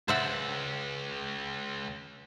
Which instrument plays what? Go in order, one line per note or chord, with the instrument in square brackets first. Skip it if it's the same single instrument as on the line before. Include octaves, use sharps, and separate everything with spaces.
[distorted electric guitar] C#2 [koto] C5 E5 F#5